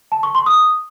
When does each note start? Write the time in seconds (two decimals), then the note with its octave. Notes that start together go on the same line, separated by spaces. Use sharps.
0.12 A5
0.23 C#6
0.35 C6
0.46 D#6